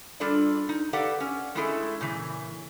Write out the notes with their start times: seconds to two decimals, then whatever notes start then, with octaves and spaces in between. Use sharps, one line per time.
0.20 G3 D4 F4 A4 D5
0.69 D#4
0.93 G4 A4 B4 D5 F5 F#5
1.20 C#4
1.55 G#3 A3 C#4 E4 G#4 A4
2.01 A#2 C#3 E3